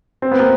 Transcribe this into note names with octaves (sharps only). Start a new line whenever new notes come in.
C4
B3
A#3